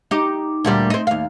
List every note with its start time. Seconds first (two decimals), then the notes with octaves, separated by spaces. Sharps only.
0.11 D#4 G4
0.65 D2 A#2 G3
0.90 C4 D#4
1.07 D#2 F5